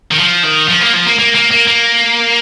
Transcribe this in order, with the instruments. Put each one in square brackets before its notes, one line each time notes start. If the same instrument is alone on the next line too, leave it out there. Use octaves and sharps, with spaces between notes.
[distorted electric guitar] D#3
F3
D#3
F3
A#3
F3
A#3
A#3
A#3
A#3
A#3